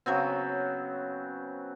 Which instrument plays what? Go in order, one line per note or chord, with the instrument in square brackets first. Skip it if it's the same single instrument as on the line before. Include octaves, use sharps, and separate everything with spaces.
[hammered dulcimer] C#3 F#3 B3 C4